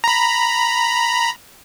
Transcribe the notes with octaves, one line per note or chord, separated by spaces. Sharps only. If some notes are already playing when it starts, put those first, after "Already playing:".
A#5 B5